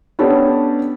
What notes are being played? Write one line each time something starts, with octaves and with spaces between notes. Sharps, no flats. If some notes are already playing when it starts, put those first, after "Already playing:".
B3 C#4 D4 G4 A4